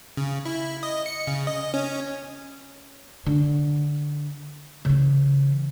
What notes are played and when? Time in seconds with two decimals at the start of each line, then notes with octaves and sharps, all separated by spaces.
0.17 C#3
0.45 E4
0.83 D#5
1.06 C#7
1.27 C#3
1.47 D#5
1.74 C#4
3.26 D3
4.85 C#3 E3